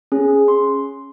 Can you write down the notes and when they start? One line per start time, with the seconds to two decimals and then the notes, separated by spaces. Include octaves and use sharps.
0.12 C#4 G#4
0.48 C6